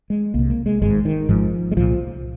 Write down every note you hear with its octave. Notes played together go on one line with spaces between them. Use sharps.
G#3
C2 C3 A#3
A#3
G#3
G#1 G#2 G#3
D#3
G#1 G#2 F3
G#3
C2 A#2 F3